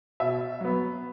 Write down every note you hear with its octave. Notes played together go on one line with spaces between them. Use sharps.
B2 E5
F#3 B3